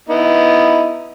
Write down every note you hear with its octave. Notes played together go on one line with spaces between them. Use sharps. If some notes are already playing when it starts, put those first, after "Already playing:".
B3 D#4 E4